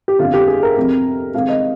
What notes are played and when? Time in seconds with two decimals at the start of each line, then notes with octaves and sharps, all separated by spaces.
0.08 G4
0.19 G1 F2 D3 F4
0.34 G4
0.48 G#4
0.63 A#4
0.77 F2 C3 F3
1.34 C2 C3 D#3 G#3 C4 F5
1.49 D#5